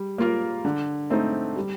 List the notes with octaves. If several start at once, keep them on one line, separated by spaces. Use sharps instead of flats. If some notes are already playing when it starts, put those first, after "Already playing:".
Already playing: G3
A#3 F4 A#4
D3
A3 C4 D#4
G3